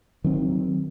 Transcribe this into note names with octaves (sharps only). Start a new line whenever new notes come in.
D#3 F#3 C4